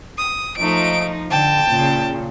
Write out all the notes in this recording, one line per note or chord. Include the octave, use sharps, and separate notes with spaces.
D#6
F3 A3 D#4 D7
D3 G5 A5
A#2 C#3